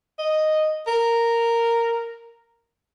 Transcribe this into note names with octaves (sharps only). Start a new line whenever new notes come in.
D#5
A#4